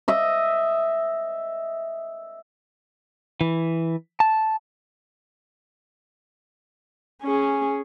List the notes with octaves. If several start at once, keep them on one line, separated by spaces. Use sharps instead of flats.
D#5 E5
E3
A5
C#4 G#4